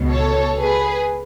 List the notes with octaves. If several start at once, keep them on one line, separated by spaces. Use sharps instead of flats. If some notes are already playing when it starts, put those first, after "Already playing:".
Already playing: C#2 B2
A4 C#5
G#4 B4